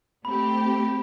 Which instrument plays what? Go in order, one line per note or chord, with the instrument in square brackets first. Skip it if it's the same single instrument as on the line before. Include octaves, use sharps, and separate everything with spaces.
[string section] A3 C4 G4 [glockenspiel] B5